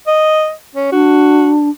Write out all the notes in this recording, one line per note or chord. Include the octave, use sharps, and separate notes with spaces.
D#5
C#4
D4 F#4